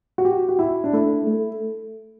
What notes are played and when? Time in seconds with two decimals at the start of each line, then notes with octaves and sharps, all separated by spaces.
0.18 F#4
0.25 G4
0.49 F#4
0.59 E4
0.84 D4
0.93 A3 E4
1.27 A3